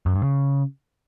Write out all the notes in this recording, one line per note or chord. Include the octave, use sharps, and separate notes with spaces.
F#2
G2
C#3